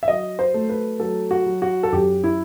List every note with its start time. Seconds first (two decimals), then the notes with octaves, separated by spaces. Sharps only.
0.03 E5
0.08 F#3 D#5
0.39 C5
0.54 A3
0.69 B4
1.00 F#3 A4
1.31 F#4
1.46 F#3
1.62 F#4
1.83 A4
1.92 F#2 G4
2.24 E4